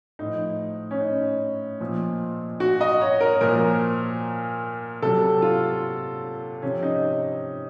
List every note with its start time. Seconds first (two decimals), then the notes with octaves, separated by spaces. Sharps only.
0.19 A2 D#4
0.24 F3
0.91 C#4
1.01 D#4
1.81 A#2 F3
2.60 F#4
2.81 D#5
3.01 C#5
3.21 A#4
3.41 A#2 F3 A#4
5.02 C3 F#3 A4
5.42 F4
6.62 C3 F3 C#4
6.83 D#4